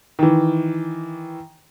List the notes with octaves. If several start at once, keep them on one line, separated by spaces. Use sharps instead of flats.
D#3 E3